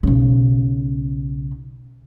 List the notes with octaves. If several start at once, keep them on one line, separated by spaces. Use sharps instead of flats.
B1 C#3